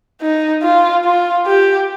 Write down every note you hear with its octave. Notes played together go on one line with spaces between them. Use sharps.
D#4
F4
F4
G4